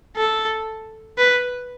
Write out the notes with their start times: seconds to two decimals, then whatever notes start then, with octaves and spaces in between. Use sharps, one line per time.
0.17 A4
1.18 B4